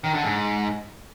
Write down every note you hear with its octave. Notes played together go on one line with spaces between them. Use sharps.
D#3
D3
G#2